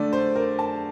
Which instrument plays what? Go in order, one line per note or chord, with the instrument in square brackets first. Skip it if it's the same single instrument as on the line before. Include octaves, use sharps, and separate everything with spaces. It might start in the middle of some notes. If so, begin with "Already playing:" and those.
Already playing: [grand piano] D3 A3 D5
C5
A#4
A5